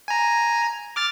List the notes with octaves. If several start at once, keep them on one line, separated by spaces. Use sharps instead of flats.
G#5 A#5
D6 F6 A6